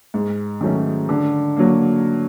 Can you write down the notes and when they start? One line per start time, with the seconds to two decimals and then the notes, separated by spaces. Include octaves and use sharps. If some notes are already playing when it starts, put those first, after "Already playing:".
0.14 G#2
0.61 D#3 F#3 A3 C#4
1.09 D3
1.56 F#3 A#3